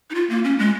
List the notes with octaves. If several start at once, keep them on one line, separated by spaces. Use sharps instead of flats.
D#4
F4
A#3
C#4
G#3